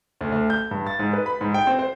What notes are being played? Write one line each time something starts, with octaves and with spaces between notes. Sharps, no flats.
D2
D2
G6
G2
A6
G#2
B4
B5
G#2
G5
C4
C5